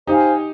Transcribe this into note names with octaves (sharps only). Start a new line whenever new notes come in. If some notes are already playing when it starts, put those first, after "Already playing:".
D#4 G4 C5 F5 G#5